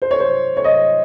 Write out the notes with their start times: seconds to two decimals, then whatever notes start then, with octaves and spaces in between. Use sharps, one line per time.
0.02 C5
0.11 C#5
0.20 C5
0.57 C#5
0.64 D#5